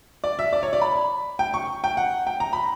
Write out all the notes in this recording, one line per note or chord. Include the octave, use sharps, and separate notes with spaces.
D5
E5
D5
C#5
D5
B5
G5
C#6
G5
F#5
G5
A#5
B5